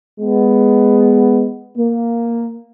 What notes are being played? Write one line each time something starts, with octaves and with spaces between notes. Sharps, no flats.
G#3 B3
A#3